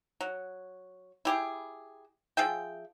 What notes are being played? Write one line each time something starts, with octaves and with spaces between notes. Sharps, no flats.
F#3
E4 G4 G#4
F3 G#4 E5 G5